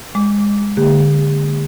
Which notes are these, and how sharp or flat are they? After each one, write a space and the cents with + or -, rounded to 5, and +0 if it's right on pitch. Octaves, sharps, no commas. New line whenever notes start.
G#3 -20 D6 -25
D3 +0 A#3 -35 G4 +45